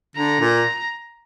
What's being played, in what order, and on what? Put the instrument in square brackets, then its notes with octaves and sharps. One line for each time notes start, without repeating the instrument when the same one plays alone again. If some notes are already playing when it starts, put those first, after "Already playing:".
[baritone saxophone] D3 [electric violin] A#5
[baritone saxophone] A#2